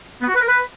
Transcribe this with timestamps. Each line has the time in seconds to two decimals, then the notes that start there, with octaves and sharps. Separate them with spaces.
0.21 B3
0.28 F#4
0.35 B4
0.41 A#4
0.48 B4